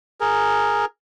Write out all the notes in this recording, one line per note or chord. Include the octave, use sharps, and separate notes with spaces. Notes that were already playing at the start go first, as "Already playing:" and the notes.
G#4 A#4